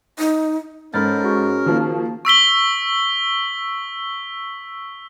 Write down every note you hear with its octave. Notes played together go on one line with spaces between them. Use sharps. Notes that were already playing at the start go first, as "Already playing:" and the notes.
D#4
G#2 C#4 A4 A#4 B5 G6 A6
F#4 G#4 C#6
D#3 F3 A#3
C#6 E6 B6 G7